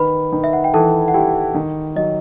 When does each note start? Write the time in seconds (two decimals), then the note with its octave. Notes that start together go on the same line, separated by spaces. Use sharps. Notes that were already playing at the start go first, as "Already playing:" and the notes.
Already playing: D#3 B4 B5
0.32 D#3
0.44 E5
0.53 F#5
0.64 G5
0.74 E3 A4 A5
1.08 F#5
1.14 E4 G4 G5
1.55 D#3
1.96 F#3 D#5